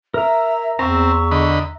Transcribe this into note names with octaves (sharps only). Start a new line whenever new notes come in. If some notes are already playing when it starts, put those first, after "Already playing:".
A#4 E5 A#5
E2 C4 E5 A#5 C#6
D3 D#5 B5